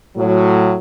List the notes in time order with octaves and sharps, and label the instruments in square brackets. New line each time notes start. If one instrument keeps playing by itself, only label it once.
[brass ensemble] A2 F#3